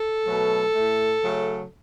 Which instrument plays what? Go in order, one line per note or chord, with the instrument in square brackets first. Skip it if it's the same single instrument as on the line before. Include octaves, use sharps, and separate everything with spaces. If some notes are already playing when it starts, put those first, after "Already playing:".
Already playing: [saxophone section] A4
B2 F#3 A3
A2 A3
C#3 F#3 A3